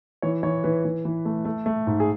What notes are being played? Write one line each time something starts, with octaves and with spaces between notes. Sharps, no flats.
E3 C#5
E3 C#5
E3 B4
E3
E3
A3
A3
A3
G#2
G#4